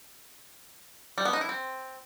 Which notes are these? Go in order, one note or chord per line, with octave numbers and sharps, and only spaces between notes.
G3
B3
D#4
E4
C4